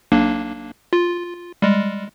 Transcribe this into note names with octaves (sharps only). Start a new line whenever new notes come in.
B1 A#3 D4
F4
G3 G#3